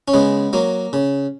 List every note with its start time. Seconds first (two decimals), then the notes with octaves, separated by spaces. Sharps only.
0.08 C#4
0.14 C#3 G#3 B3
0.53 F#3 A#3
0.93 C#3